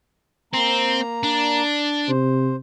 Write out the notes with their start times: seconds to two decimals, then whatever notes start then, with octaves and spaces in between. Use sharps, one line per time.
0.53 A#3 C4 A#5
1.23 D4
2.09 C3 C5